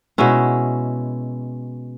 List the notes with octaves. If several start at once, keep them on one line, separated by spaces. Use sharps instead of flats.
B2 G#3 C#4 E4